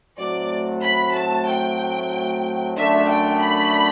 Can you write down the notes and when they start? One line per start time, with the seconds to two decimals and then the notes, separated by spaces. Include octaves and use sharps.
0.19 A2 F#3 A3 C4 F#4 D5
0.83 B5
1.15 A5
1.48 G5
2.77 F#2 D3 A3 D4 E5
3.10 G5
3.41 B5